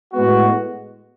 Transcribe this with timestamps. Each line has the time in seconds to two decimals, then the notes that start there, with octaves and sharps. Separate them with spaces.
0.13 A2 G#3 B3 F#4